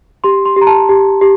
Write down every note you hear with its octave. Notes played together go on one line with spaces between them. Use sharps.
G4 C6
C6
G4
A#5
A5
G4
G4